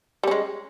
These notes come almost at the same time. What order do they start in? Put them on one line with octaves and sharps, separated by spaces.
G3 C#4 G#3